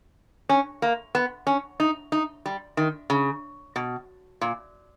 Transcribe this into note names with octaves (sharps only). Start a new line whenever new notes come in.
C#4
A#3
B3
C#4
D#4
D#4
G3
D#3
C#3
B2
A#2